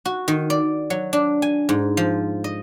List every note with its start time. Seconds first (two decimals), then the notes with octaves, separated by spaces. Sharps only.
0.05 F#4
0.28 D#3
0.50 D5
0.90 F#3
1.13 D4
1.42 G#5
1.69 G#2
1.97 F3
2.44 D#5